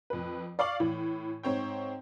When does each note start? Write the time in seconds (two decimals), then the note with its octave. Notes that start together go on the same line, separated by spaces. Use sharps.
0.10 F2 B4
0.59 D5 F5 C#6 D6 F#7
0.80 A2 E3
1.43 G#2 C4 C#5 G5